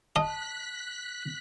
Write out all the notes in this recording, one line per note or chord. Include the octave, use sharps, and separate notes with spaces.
D#5 A5 F#6 B6